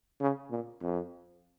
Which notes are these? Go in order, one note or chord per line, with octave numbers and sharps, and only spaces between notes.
C#3
A#2
F2